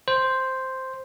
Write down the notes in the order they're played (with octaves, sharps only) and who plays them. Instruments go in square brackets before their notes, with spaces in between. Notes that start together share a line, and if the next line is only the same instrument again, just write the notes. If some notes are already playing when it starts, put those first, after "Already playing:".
[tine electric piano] C5